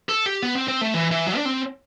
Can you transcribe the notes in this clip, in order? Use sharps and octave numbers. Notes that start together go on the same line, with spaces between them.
A4
G4
B3
C4
C4
A3
E3
E3
F#3
D4
C4